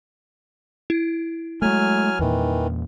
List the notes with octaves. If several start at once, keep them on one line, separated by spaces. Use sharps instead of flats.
E4
F#3 G#3 A3 G#5 F6
E2 A#2 D#3 E3